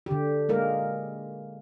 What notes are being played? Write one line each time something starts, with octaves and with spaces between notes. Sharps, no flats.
D3 G4
G#3 A#3 A#4